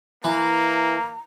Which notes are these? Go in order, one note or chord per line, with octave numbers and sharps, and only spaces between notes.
E3 A#3 A#5